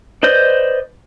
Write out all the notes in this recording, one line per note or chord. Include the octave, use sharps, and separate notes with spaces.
B4 C5 D5 D#5 G6